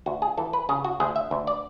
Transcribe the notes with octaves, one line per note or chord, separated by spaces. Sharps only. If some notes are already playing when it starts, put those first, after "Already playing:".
D2 F#4
G#4
E3 A4
B4
C#3 G#4
F#4
D2 G#4
E5
D2
D5